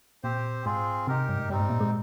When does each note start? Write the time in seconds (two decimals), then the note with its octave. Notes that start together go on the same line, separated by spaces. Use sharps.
0.23 A#2 C4 G4 C5
0.65 G#2 C4 F4 G#4
1.07 C3 D#4 G4 A#4
1.29 G2
1.39 G#2
1.49 G2 G3 C4 D#4
1.60 G#2
1.69 A#2
1.80 G#3